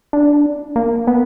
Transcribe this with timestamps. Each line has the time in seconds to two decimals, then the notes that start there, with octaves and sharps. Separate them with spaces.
0.13 D4
0.76 A#3
1.07 B3